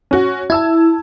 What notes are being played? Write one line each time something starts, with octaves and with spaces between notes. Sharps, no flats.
C#4 F#4
E4 A5 E6 G#6